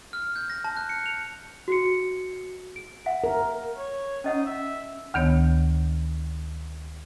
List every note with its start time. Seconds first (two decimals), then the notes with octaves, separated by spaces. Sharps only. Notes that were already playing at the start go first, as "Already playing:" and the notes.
0.13 F6
0.36 G6
0.50 A#6
0.64 A5
0.77 F#6
0.89 C#7
1.06 F7
1.68 F#4 C7 C#7
2.76 D7
3.06 E5 F#5
3.24 A#4
3.77 C#5
4.24 C#4 D#4 D#5 F#5
4.46 E5
5.14 D2 D#3 B3 C#5